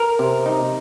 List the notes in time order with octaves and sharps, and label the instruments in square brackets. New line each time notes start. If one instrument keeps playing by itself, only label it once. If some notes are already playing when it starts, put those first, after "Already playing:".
Already playing: [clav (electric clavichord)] A#4
C3
D#4